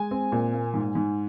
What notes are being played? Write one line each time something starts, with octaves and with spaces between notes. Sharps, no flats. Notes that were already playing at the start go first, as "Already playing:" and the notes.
Already playing: G#3 G#5
C4
A#2
A#3
G#2
G#2